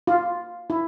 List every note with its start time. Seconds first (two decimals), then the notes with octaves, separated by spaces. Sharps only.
0.07 F4
0.70 E4